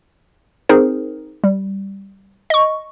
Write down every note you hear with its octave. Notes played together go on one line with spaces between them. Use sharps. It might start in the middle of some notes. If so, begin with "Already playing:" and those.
C4 D#4 G#4 A#4 C5
G3
D#5 C#6